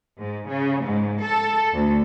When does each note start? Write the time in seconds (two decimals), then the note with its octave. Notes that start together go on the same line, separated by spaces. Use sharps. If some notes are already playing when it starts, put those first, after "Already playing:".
0.19 G#2
0.48 C#3
0.84 G#2
1.23 A4
1.74 D2